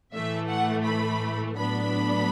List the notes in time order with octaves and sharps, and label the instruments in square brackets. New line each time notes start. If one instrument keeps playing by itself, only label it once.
[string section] A2 E3 A3 E5
F#5
B5
A2 F#3 B3 D4 B5